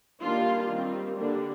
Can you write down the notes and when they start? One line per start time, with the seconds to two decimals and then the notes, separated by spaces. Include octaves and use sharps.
0.21 D#3 G3 A#3 D4 F4
0.69 D#3 G3 C4
1.16 D3 G3 A#3 D4